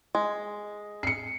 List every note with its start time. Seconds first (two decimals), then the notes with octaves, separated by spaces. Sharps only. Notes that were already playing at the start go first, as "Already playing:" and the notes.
0.15 G#3
1.03 C7 C#7